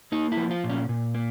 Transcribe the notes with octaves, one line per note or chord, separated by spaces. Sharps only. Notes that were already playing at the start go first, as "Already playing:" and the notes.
A#3 D#4
E4
F3
F4
A#2
C#4
A#2
A#3